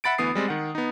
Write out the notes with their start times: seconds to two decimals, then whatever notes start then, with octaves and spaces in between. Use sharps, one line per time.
0.04 E5 F#5 B5 A6 D7
0.18 D2 E3 B3 D#6 C7
0.35 G3 G#3 C4
0.48 D#3 F#5
0.75 B3 D#4